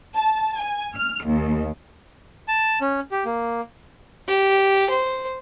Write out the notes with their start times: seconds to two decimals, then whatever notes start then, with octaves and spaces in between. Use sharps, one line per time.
0.16 A5
0.58 G#5
0.95 F6
1.26 D#2
2.48 A5
2.81 C#4
3.11 G4
3.25 A#3
4.28 G4
4.90 C5